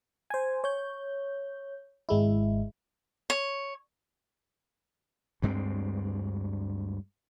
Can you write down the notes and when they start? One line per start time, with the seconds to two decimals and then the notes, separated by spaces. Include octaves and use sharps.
0.30 C5 G#5
0.64 C#5 G6
2.09 G#1 G#3 E4
3.30 C#5
5.42 D2 G2 G#3 C4